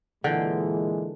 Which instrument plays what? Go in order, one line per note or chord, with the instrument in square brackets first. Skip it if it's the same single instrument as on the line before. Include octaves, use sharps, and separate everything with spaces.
[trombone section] A#2 E3 G#3 [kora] D3 G5